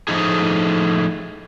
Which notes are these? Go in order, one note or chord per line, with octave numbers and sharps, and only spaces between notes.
A2 F3 A3 D#4 G#4